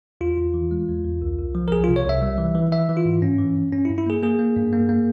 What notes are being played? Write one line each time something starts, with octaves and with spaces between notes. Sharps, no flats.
E2 F4
E2
E3
G#3
E2
E2
C2
C2
F3
A#4
C2 G#4
C3 F4
C#5
C2 E5
G3
E3
E3
E3 E5
E3
F4
G#2
G2 C#4
E3
G2
G2 C#4
E4
G2
E4
A#3 G#4
A#3 G#4
A#3
G2
A#3
A#3